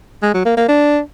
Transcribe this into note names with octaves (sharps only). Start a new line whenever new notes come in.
G#3
F#3
A#3
A#3
D4